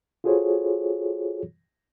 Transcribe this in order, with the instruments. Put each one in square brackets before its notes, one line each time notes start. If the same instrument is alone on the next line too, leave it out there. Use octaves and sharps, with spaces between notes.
[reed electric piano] F4 F#4 G#4 A4 C5 C#5